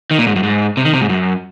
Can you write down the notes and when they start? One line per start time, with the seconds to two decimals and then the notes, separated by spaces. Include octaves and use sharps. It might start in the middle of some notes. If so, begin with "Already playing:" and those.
0.11 D#3
0.19 A#2
0.27 G#2
0.36 F#2
0.43 G#2
0.77 C3
0.85 D#3
0.94 C3
1.01 G#2
1.09 F#2